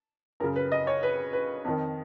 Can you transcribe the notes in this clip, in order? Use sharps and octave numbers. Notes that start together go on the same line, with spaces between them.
F#2 C#3 A#4
B4
D#5
C#5
B4
B4
F2 D#3